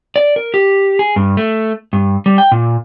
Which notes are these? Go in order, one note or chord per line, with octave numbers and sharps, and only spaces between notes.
D5
A#4
G4
G#4
G2
A3
G2
G3
G5
A#2